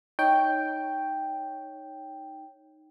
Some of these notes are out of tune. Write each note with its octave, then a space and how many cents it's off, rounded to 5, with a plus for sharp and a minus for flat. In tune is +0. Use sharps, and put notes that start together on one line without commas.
D#4 +0 C#5 +0 G5 +0